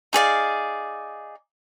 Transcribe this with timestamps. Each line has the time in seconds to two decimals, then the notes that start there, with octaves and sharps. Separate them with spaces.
0.13 D#4 G#4 D5 F5